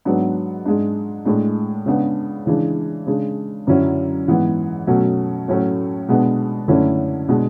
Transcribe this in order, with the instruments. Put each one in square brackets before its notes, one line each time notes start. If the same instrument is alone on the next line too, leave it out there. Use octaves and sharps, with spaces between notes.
[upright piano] G#2 F#3 B3 D4
G#2 G#3 D4
A2 G#3 D4
C#3 G#3 B3 D4
C#3 E3 G#3 D4
C#3 G#3 D4
F#2 D3 F#3 C#4 E4
G#2 E3 B3
B2 F#3 A3 C#4
A2 F#3 A3 C#4
B2 G#3 B3 D4
F#2 D3 A3 C#4 E4
B2 G#3 D4